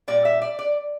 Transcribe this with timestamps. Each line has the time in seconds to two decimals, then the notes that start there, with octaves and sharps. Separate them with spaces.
0.08 A#2 G3 D5
0.25 E5
0.42 D5
0.59 D5